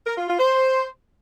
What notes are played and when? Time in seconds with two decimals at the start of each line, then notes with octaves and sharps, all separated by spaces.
0.07 A#4
0.17 F4
0.28 F4
0.39 C5